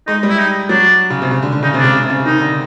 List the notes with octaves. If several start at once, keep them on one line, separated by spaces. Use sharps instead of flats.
G#3 D#4
G3
E4
D#4
F#3 D4
C#3
C3
C#3
D3
D3
C#3 D#4
C3
D4
C#3
C3
C#3
D#3 D#4
D3